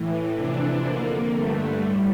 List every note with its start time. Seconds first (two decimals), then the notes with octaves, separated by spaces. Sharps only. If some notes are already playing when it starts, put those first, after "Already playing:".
Already playing: A2 E3
0.35 F2 C3 E3 D4
0.85 F2 D3 A#3
1.34 G2 D3 A3
1.83 A2 G3